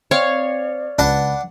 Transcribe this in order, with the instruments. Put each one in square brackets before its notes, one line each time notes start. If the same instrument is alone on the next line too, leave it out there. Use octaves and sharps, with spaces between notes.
[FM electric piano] C4 [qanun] C#5 F5 [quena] D5
[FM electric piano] C#2 B4 [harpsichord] D4 F#5 A5